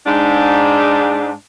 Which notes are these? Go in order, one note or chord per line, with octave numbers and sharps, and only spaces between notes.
G#2 D4